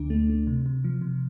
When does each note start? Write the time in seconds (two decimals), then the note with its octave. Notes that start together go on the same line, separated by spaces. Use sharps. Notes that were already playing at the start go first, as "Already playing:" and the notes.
Already playing: D2 D3 D4
0.10 A3
0.30 A3
0.47 C3
0.66 C3
0.84 F3
1.01 C3